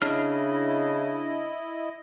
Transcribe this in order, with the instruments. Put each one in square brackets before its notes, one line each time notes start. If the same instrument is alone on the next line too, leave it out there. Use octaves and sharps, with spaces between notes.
[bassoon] C#3 [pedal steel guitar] D4 F6 [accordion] E4 D#5